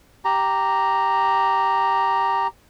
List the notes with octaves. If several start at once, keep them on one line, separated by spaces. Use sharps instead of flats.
G4 A#5